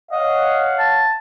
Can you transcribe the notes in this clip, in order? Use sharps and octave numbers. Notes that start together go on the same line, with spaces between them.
C#5 D#5 F5 F#5
A5